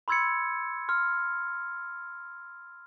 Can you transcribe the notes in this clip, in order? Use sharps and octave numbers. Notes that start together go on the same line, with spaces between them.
B5 C6 E6 G#6 A6 C#7
C6 F6